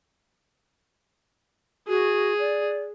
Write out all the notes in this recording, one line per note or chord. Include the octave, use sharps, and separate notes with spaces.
F#4 G#4
D5